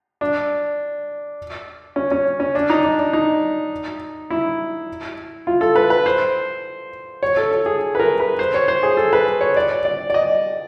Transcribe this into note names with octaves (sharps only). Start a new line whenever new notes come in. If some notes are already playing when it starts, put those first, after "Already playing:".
D4
C#4
C#4
C#4
D4
D#4
D4
D4
D#4
E4
F4
A4
B4
B4
C5
C#5
A4
A4
G#4
B4
A#4
B4
C5
C#5
C5
G#4
A4
B4
C#5
D5
D5
D5
D#5